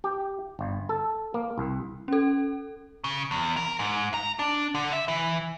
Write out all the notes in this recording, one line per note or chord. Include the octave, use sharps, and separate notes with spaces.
G4
G1
A4
A#3
C2
C#4 A4
C#3
E2
A#4
G#2
A#5
D4
D3
E5
E3